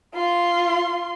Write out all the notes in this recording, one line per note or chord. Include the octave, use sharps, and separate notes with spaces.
F4 C6